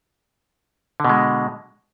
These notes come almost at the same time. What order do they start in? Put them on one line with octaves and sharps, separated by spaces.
D3 B2 G#3